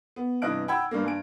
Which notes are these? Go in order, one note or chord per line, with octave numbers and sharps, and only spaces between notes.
B3
G2 C3 E3 D#5 F#6 D7
F#5 G5 B5 E6 G#6
G2 A#3
G2 G#5 D7